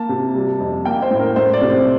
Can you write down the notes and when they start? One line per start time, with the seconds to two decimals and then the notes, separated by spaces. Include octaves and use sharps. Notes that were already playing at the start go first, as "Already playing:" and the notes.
Already playing: A#3 A5
0.09 C3
0.35 G3
0.60 F2
0.85 A#3 G5
1.02 C5
1.11 A2
1.20 A#4
1.36 A3 C5
1.53 D5
1.61 C3
1.70 C5